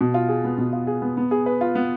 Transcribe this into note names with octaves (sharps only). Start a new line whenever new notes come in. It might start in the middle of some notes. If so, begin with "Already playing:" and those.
B2
F4
G#4
B3
B2
F4
G#4
B3
B3
G#4
B4
F4
B3